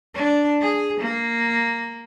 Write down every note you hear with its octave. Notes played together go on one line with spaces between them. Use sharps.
D4
G#4
A#3